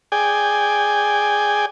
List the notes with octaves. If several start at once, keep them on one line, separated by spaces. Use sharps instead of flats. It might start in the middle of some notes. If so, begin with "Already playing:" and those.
G#4 D5 G5 G#5